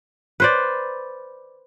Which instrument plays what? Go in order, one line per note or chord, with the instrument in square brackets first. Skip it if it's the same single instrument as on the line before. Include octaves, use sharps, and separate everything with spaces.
[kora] B4 C5 D5